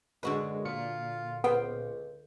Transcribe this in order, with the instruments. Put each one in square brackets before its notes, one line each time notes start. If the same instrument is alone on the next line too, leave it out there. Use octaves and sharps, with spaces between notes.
[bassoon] F#2 [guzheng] D3 F#4 B4 [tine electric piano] G#3
[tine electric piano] A#2 C#7 [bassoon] F4
[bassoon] C#2 [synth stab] B3 [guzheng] C5 F5 G5